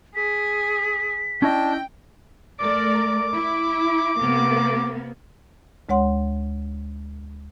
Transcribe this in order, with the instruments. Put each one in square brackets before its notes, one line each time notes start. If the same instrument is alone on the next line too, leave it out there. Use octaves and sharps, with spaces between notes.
[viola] G#4 [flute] B6
[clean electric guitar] C#4 E4 D#5 [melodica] D4 [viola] G5
[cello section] A3 A#4 D5 [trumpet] D6
[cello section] E4
C3 A#3 B3
[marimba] D2 G#3 C#5 F#5 C6